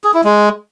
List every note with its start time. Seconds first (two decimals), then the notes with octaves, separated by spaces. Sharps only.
0.04 G#4
0.14 E4
0.24 G#3